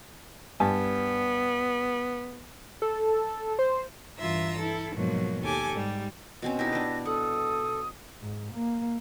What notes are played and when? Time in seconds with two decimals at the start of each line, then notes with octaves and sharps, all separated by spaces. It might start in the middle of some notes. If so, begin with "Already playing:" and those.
0.60 G2 B3 G#5 A5
2.82 A4
3.59 C5
4.18 G2 E3 F4 E5 A#5 E6
4.58 E4 A4
4.93 G#2 B2 F3 F#3 A#3
5.42 D#2 G4 A4 G#5 D6
5.74 G#2 G3
6.42 B2 C4 C#4
6.59 D#4 E4 G4 A#6
6.72 D4 B4
7.06 A4 F#5 D#6
8.22 G#2
8.54 A#3